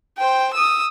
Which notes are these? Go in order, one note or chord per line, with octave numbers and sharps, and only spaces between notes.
C5 G5
D#6 E6